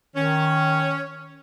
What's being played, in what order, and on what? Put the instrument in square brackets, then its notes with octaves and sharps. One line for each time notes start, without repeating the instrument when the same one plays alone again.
[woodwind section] D#3 [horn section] C#4